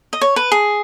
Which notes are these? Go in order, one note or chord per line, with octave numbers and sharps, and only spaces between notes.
D#5
C#5
B4
G#4